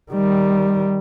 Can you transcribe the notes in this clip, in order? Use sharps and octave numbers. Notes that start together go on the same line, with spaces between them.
D#3 G3